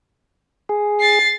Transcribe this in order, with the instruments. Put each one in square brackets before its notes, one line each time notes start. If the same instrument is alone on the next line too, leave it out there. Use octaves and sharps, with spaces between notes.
[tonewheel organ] G#4
[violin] A6 C7